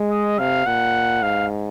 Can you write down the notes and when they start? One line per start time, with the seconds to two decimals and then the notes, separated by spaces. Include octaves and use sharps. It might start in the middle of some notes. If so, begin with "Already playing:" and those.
Already playing: G#3
0.11 D#5
0.39 C3 F5
0.66 A#2 F#5
1.22 G#2 F5